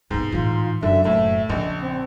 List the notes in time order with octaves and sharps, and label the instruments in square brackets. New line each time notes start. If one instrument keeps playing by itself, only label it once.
[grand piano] G#2 [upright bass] C3 B3
[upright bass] A2 E3 [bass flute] F4
[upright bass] F#1 [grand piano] F#2 D3 [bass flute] E5
[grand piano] A2 [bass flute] E5
[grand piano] A#1 [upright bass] C#3 [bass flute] D#5
[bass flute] C4